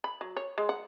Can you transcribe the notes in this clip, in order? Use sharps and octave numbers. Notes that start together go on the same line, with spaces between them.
B5
F#3
C#5
G#3
F#5